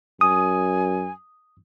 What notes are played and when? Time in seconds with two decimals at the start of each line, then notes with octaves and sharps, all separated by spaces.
0.21 F#2 G#5 D#6